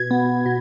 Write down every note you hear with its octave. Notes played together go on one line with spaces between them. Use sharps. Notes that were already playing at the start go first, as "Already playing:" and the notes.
Already playing: B2 G#6
B3
B2